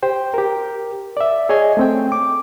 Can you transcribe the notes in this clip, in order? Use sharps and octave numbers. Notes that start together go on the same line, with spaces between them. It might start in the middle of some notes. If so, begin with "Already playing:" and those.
G4 C5 G5
G4 A#4
D5 E5
G#4 C#5 D#5 G#5
A3 C4 G5
D6